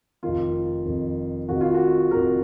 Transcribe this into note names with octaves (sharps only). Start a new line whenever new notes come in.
F1 F2 D#3 F4
F1 F2 D#3
F1 F2 D#3 F#4
F4
F#4
F1 F2 D#3 A#4